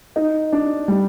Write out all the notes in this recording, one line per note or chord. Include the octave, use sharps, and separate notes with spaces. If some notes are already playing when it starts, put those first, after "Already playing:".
D#4
D4
G3